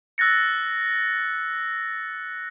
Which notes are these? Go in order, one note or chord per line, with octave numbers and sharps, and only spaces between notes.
E6 F#6 A6 A#6 C#7